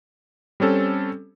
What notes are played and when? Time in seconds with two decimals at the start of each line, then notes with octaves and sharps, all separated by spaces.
0.60 G3 C4 C#4 A4